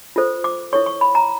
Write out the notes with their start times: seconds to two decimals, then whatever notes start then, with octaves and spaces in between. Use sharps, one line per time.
0.16 F4 A4 C5
0.44 D6
0.73 E4 A4 C#5 C#6
0.86 C#6
1.01 B5
1.15 A#5